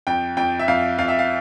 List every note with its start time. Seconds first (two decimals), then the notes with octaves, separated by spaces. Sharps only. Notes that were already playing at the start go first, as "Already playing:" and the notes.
0.07 F2 G5
0.37 F2 G5
0.59 E5
0.68 F2 F5
0.98 F2 F5
1.08 E5
1.19 F5